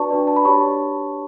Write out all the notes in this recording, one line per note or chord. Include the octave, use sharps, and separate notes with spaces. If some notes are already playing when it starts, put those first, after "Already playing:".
Already playing: D4 F#4 B4 D5 A5 C#6
D4 F#4 B4 D5
A5
B5
D4 G4 C#5 A5 C#6